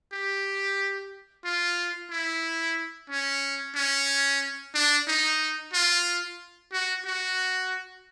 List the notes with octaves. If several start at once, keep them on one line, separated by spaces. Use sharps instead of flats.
G4
F4
E4
C#4
C#4
D4
D#4
F4
F#4
F#4